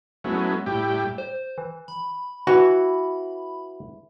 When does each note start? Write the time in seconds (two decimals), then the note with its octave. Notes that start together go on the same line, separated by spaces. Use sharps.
0.24 F#3 G#3 A3 B3 C#4 E4
0.66 A2 G3 E4 G4 G5
1.18 C5
1.58 E3
1.88 B5
2.47 E3 F#4